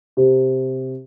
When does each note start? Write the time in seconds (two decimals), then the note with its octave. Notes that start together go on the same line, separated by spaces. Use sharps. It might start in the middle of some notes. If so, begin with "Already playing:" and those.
0.17 C3